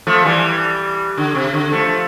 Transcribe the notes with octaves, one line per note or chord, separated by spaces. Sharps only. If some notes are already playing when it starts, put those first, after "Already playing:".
F3 A3
E3 G3
D3
C3
D3
F3 A3